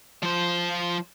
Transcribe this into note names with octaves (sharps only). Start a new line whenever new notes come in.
F3 C5